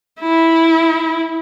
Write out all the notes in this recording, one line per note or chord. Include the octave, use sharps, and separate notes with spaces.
E4